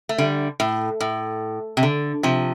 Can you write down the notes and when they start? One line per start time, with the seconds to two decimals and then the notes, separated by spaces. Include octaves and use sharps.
0.09 A3
0.18 D3 G3
0.60 A2
1.00 A2
1.77 C3
1.83 D3
2.23 C3 F3